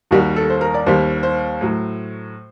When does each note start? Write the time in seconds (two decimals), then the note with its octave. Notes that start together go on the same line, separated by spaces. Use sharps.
0.11 D#2 D#3 G3 F#4
0.36 A4
0.50 C5
0.61 A#4
0.74 D5
0.86 D#2 D#3 G3 C5
1.23 C5
1.61 A2 F#3